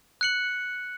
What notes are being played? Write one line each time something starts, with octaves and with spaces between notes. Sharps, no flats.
F#6 C#7 F#7